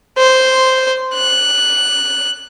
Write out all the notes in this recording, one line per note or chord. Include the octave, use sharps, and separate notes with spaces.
C5
F#6